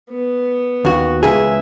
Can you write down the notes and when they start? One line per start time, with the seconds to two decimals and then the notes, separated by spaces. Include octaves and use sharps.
0.10 B3
0.85 D#2 F#4
1.23 C#2 E3 G#4 E5